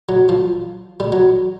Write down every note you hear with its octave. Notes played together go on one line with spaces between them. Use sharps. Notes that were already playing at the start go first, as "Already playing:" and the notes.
F#3
F3
G3
F#3